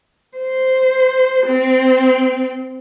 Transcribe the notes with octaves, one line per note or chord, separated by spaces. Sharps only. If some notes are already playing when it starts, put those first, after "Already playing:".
C5
C4